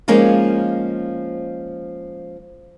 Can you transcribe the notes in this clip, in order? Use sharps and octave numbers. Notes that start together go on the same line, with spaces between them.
F3 G#3 A#3 C#4 D#4 F4